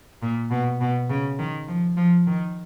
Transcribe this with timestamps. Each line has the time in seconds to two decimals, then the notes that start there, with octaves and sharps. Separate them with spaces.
0.22 A#2
0.51 B2
0.81 B2
1.09 C#3
1.39 D#3
1.68 F3
1.97 F3
2.27 D#3